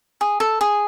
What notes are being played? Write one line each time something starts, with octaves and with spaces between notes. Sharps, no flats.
G#4
A4
G#4